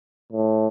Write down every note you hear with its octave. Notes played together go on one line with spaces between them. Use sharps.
A2